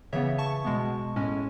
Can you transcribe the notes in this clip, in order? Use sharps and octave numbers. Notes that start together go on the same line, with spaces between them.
C#3 E3 B3 C#5 E5
A5 C#6
B2 G#3 B3
A2 G#3 C#4